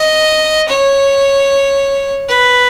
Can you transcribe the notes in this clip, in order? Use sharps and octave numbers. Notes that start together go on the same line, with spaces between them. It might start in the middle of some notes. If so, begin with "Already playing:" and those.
Already playing: D#5
C#5
B4